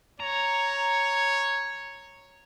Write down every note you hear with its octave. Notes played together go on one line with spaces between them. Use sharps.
C#5 A#5